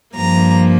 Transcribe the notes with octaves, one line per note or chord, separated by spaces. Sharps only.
G2 F3 A#3 A#5